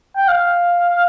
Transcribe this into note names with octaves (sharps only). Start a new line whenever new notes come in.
G5
F5